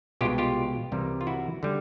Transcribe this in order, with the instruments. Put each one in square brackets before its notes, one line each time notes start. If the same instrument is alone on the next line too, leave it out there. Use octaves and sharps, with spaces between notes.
[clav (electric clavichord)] C2 B2 G#3 F4 G4
F4 G4
C2 C3 E3 G3 A#3
F4
E4 F#4
D3 G3